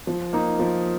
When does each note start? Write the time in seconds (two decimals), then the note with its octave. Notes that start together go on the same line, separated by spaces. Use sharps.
0.07 F3
0.33 A#3 D#4
0.59 F3